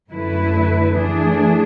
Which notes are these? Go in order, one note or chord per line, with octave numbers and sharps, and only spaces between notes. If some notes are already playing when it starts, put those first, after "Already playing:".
F#2 D3 A3 E4 B4
E3 A3 D4 G#4